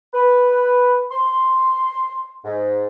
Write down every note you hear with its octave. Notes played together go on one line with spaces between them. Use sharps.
B4
C6
G#2